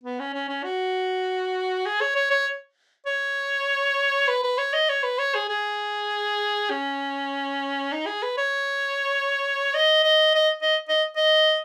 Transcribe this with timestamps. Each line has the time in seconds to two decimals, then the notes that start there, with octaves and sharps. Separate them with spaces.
0.03 B3
0.19 C#4
0.34 C#4
0.49 C#4
0.64 F#4
1.85 G#4
2.01 C#5
2.15 C#5
2.31 C#5
3.06 C#5
4.28 B4
4.43 B4
4.58 C#5
4.73 D#5
4.89 C#5
5.03 B4
5.18 C#5
5.35 G#4
5.49 G#4
6.70 C#4
7.92 D#4
8.06 G#4
8.22 B4
8.37 C#5
9.74 D#5
10.04 D#5
10.35 D#5
10.62 D#5
10.89 D#5
11.16 D#5